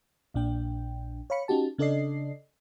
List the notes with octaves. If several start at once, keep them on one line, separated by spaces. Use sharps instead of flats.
A#1 A#2 D4 G5
C#5 F5 B5 C#7
C#4 D#4 F#4 G4 A5
C#3 D4 A4 D5 D#5 C7